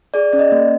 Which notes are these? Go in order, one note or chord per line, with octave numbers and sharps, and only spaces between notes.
G#4 D5
C#4 D5
D#5
A#3